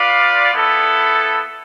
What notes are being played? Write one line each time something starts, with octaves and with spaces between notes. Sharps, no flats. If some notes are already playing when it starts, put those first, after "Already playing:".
Already playing: F4 B4 D5 F5
B3 E4 A4